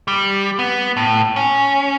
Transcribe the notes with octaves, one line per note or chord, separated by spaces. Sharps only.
G3
B3
A2
C#4